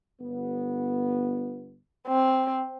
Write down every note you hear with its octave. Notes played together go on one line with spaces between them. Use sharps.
G1 B3
C4